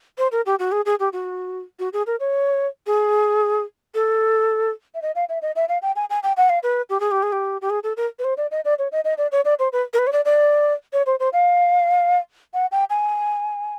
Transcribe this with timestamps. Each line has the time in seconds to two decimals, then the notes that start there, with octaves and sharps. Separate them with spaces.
0.18 C5
0.32 A#4
0.46 G4
0.59 F#4
0.72 G#4
0.86 G#4
1.00 G4
1.13 F#4
1.79 F#4
1.93 G#4
2.07 A#4
2.20 C#5
2.87 G#4
3.95 A4
4.94 E5
5.02 D#5
5.15 F5
5.29 E5
5.42 D#5
5.56 E5
5.69 F5
5.82 G5
5.96 G#5
6.10 G#5
6.23 G5
6.37 F#5
6.49 F5
6.63 B4
6.90 G4
7.00 G#4
7.11 G4
7.23 G#4
7.32 G4
7.62 G4
7.70 G#4
7.84 A4
7.97 A#4
8.19 B4
8.24 C5
8.37 D5
8.51 D#5
8.65 D5
8.79 C#5
8.92 D#5
9.05 D#5
9.18 D5
9.32 C#5
9.45 D5
9.59 C5
9.73 B4
9.94 A#4
9.99 B4
10.07 C#5
10.13 D5
10.25 D5
10.93 C#5
11.06 C5
11.20 C5
11.33 F5
12.54 F#5
12.72 G5
12.90 G#5